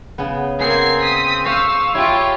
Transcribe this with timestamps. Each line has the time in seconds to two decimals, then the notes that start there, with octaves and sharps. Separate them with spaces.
0.18 C#3 B3
0.60 A#3 C4 G#4 F#5 G#6 C7
1.02 D#6 B6
1.46 C5 F5 C#6 E6
1.95 E4 F4 G4 C#5 G#5